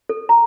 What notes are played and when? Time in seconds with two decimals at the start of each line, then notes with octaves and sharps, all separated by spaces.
0.09 A4
0.29 A#5